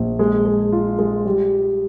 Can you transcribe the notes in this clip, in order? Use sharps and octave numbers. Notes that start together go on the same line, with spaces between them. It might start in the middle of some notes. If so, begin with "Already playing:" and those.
Already playing: A#1
G#3
G#3
F4
G#3
G3